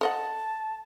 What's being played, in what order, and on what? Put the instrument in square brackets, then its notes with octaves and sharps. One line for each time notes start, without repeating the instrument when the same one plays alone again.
[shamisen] A4 D#5 F#5 [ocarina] A5